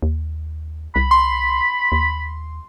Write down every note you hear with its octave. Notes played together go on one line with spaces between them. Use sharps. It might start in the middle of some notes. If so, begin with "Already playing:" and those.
D#2
C2 B5
C6
D#2